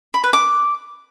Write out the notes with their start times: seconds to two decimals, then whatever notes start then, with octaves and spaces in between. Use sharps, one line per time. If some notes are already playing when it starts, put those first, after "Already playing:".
0.14 B5
0.24 B4
0.33 D6